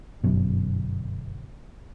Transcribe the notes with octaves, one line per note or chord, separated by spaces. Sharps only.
G1 F#2 B2